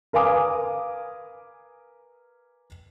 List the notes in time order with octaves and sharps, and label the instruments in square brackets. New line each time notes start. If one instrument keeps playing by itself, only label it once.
[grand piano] A#4 B4 F5 G#5 D6 D#6